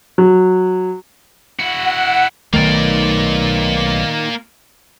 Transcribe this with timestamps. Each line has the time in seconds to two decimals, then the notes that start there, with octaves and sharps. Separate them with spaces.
0.18 F#3
1.59 E4 F#4 F#5
2.53 B1 D#3 A3 A#3 D5